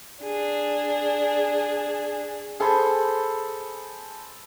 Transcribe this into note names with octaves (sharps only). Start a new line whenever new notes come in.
D4 G#4
G#4 A4 C5 B5